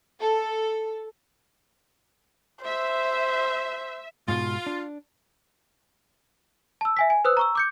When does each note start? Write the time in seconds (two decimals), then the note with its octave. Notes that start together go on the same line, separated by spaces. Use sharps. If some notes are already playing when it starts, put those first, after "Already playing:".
0.20 A4
2.65 C5 E5
4.28 G#2 B2 F4
4.66 D4
6.81 A5 E6
6.97 E5 G#5 B6
7.10 G#5
7.25 B4 C5 D#6 E6 F#6
7.37 A#5 C#6 E6
7.55 D6 G6 C#7